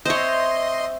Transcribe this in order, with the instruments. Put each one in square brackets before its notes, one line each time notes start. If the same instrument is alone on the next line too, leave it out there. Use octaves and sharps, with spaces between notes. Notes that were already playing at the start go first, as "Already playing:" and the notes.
[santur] C4 E5 E6 [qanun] C5 C#5 [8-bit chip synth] D#5 C6